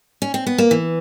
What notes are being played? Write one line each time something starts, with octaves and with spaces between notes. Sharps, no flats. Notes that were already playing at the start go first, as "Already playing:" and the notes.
C#4
C4
B3
A#3
E3